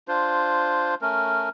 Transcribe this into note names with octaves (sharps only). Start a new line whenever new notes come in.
D4 F4 C5
A3 C#4 A#4